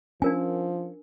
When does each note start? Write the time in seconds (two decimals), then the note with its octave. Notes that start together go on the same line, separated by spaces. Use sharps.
0.22 F3 C#4 D4 A#4 G#5